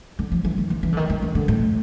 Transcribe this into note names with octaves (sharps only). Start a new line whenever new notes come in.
D3
F3
E3
D#3
D#3
E3
D3
D#3
D#3
D3
D3
A2